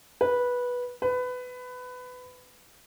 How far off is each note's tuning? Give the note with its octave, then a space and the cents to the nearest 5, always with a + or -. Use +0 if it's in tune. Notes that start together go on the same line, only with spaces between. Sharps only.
B4 -10
B4 +20